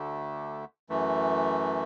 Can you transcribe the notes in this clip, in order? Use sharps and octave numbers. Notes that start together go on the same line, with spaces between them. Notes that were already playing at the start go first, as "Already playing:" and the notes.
Already playing: D2 D3 A3
F#2 E3 A3